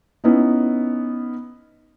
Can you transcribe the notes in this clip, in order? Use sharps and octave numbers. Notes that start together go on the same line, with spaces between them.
B3 C#4 D#4 E4